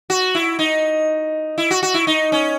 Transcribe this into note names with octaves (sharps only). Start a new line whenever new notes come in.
F#4
E4
D#4
E4
F#4
F#4
E4
D#4
C#4